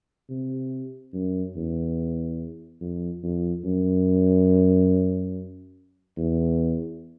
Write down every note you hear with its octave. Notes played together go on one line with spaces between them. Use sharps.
C3
F#2
E2
F2
F2
F#2
E2